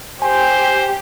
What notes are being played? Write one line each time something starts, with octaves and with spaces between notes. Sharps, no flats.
G4 C5 G#5